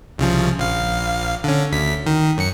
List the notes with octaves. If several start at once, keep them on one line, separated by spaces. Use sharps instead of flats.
C2 C#3 F3
A#1 F5
D3 C#4
D2 B6
D#3
F#2 C#7